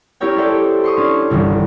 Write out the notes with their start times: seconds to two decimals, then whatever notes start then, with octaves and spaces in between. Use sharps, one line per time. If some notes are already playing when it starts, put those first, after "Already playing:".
0.20 C#4 E4 G4 A#4 C#5 G5
0.36 A4 C5 D5 E5 G5 A5
0.84 C6 C#6 D#6
0.97 C#4 D4
1.30 G1 C2 D#3 E3